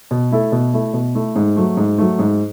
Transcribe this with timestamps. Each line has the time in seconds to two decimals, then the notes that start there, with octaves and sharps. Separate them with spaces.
0.11 B2
0.31 A3 E4 A4
0.52 B2
0.73 A3 E4 A4
0.93 B2
1.15 A3 E4 A4
1.36 G#2
1.56 F#3 A3
1.77 G#2
1.98 F#3 A3
2.19 G#2